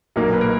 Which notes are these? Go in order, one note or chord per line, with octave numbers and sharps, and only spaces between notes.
B1 A#2 F#3 A#3 D#4
A#4
B4
A#4